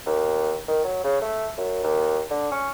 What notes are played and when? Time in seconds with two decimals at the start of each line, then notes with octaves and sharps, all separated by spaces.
0.06 D#2
0.68 D#3
0.84 F#3
1.04 C#3
1.22 A3
1.58 F#2
1.83 D#2
2.30 D3
2.52 C#4